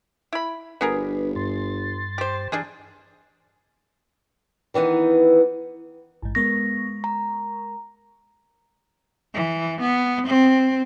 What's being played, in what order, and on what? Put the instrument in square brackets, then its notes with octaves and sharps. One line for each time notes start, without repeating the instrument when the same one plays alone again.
[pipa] E4 B5
[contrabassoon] G1 [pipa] B3 G#4 A#4 [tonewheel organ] D4 B4
[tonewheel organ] G2 C6 A6
[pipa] G4 C5
[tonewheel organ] E3 [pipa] G3 D4 G#4
[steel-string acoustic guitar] D#3 E3 B3 D#4
[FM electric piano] A1 G#2
[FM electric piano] G#3 A#4 C#6 [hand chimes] B3 A#6
[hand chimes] A#5
[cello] E3
B3
C4